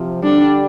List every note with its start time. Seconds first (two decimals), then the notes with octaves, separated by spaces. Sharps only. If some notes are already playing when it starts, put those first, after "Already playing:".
Already playing: C3 F3
0.22 D3 G3 D4